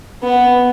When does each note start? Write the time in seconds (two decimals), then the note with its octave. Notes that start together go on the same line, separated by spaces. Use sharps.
0.23 B3